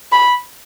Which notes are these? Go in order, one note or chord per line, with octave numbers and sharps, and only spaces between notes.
B5